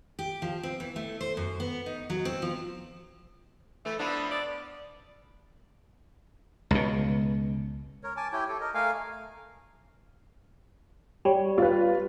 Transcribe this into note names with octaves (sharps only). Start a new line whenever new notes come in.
G4
F3
C4
E3
A3
C5
F#2
B3
D#4
F#3
C4
F3
E3 A3
F3 B3 D4 E4
D5
C#2 B2
A#4 C#5
G#5 A5 D6
E4 G4 C#5 G5
G4 A4
A#4 D#5
A3 A#4 F5 G#5
G3 C#5
F4 B4